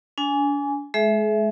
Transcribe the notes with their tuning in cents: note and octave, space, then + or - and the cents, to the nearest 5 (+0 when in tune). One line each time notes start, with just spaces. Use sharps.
D4 -35 G#5 +0
G#3 +30 G#4 +40 E5 +0